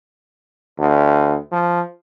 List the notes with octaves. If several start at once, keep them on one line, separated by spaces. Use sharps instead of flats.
D2
F3